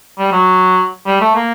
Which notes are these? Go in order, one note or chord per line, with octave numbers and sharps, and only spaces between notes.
G3
F#3
G3
A3
A#3